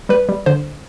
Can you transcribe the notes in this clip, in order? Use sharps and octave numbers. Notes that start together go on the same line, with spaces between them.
G3 B4
G3
D3 C5